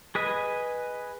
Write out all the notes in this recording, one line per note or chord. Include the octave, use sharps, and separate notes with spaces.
G#4 B4 D#5 G#5